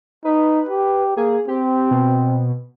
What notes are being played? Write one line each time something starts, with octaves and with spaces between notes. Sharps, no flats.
D#4 B4
G4
A#3 G#4
C4 G4
B2